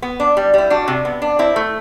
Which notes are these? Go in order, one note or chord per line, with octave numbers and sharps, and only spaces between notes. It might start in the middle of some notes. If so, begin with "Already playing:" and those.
B3
D4
G3
G3 E4
D4 F#4
C3
B3
D4
C4 E4
A3